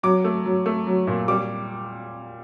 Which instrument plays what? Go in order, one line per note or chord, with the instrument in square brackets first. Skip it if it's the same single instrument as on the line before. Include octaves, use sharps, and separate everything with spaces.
[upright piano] F#3 D6
A3
F#3
A3
F#3
A#2
G3 D6